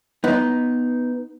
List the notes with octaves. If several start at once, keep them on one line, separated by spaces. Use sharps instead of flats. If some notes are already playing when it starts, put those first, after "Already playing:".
B3 D#4